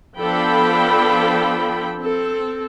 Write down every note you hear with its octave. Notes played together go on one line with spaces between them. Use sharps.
F3 B3 D4 A4 G5 B5
C4 A4